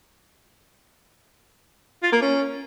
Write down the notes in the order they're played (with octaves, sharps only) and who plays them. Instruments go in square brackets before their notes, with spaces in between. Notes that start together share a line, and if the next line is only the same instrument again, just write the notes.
[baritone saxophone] F4
A#3
C#4